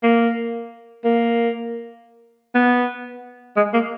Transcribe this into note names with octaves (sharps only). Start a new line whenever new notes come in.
A#3
A#3
B3
G#3
A#3